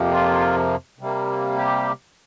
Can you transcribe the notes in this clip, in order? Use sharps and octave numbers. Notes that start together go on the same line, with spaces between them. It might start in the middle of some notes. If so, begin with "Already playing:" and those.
Already playing: F2 C3 F3 A#3
F4
C3 G3 A#3
G4